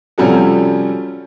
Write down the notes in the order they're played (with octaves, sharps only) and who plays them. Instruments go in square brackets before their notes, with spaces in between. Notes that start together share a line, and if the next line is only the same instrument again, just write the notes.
[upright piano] C3 F3 G3 C#4 F#4 A4